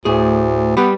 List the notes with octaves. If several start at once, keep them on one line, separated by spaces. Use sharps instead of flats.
D2 A2 G#4
G3 B3 G4 B4